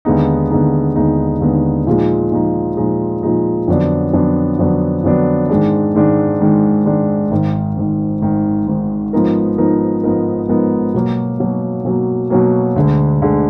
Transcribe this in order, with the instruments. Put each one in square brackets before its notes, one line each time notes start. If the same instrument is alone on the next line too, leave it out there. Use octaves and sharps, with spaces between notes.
[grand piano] D#2 D3 G#3 B3 D#4
D#2 D3 G#3 B3 D#4
D#2 D3 G#3 B3 D#4
D#2 D3 G#3 B3 D#4
A#2 F3 G#3 D#4
A#2 F3 G#3 D#4
A#2 F3 G#3 D#4
A#2 F3 G#3 D#4
F2 D3 F#3 B3 D4
F2 D3 F#3 B3 D4
F2 D3 F#3 B3 D4
F2 D3 F#3 B3 D4
G#2 D#3 G#3 D4
G#2 D#3 G#3 D4
G#2 D#3 G#3 D4
G#2 D#3 G#3 D4
G#1 G#2 D#3
G#1 G#2 D#3
G#1 G#2 D#3
G#1 G#2 D#3
G#2 F3 B3 D#4 A#4
G#2 F3 B3 D#4 A#4
G#2 F3 B3 D#4 A#4
G#2 F3 B3 D#4 A#4
B2 F#3 A#3
B2 F#3 A#3
B2 F#3 A#3
B2 F#3 A#3
D2 D3 G#3
D2 D3 G#3